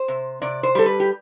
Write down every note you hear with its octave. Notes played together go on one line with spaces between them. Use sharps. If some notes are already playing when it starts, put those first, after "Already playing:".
Already playing: C5
C3
C3 D5
C5
G3 A4
B4
G4